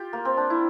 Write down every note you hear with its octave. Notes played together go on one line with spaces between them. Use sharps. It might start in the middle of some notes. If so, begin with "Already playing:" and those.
Already playing: F4 G4
A#3
C4
D4
E4